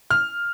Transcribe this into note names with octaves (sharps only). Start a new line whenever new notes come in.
F6